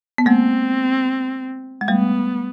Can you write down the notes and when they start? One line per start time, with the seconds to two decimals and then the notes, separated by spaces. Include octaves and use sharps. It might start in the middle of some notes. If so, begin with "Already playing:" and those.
0.18 B3
0.26 G#3 A#3 C4
1.81 G#3
1.88 G3 A3 B3